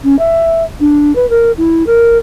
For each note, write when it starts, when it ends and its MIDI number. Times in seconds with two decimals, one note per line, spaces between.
0.04 0.18 61
0.19 0.63 76
0.80 1.14 62
1.15 1.28 71
1.30 1.52 70
1.57 1.85 64
1.86 2.17 70